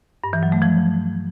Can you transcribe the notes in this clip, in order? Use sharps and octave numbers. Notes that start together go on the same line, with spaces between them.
G2
E3
F#3
A3
F3